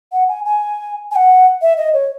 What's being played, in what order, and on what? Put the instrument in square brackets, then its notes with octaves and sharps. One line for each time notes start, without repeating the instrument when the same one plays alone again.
[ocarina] F#5
G#5
G#5
G#5
F#5
E5
D#5
C#5